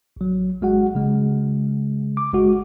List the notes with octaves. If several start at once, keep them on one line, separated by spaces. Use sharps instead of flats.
A1 F#3
G#1 G#3 F#4 F#5
C#3 G#3
D6
G1 G#3 F#4